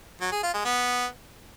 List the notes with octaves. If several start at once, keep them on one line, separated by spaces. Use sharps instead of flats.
F#3
G#4
F4
G#3
B3